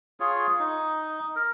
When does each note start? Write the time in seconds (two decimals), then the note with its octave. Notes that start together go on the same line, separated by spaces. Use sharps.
0.20 F4 G#4 C#5
0.59 D#4
1.36 A#4